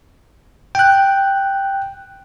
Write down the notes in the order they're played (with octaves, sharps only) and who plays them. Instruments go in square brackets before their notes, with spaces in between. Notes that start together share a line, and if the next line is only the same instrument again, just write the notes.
[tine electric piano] G5 F#6